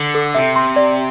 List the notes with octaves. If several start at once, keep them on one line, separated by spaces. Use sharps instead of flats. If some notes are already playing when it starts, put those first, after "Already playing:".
Already playing: D3
A4
C3 E5
C6
D5